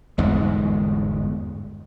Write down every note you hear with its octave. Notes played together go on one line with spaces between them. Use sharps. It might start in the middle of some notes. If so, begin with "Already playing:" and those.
G1 E2 G#2 G#3